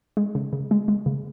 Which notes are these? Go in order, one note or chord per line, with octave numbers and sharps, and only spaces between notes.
G#3
C#3
C#3
G#3
G#3
C#3